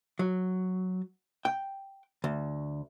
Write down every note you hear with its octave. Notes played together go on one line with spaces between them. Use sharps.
F#3
G5
D2